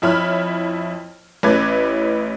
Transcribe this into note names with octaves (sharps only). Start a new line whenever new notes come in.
F2 E4 C#5 B5 F6
A1 C#4 E4 B4 D6 G#6